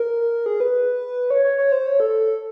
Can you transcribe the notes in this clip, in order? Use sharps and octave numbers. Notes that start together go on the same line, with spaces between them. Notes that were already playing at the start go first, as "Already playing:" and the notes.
Already playing: A#4
G#4
B4
C#5
C#5
C#5
C5
C#5
A4